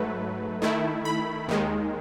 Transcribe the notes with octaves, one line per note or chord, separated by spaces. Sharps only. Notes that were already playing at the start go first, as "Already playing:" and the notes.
Already playing: G#2 F#3 A3 B4
D#3 A3 E4
B5
D#2 D#3 G#3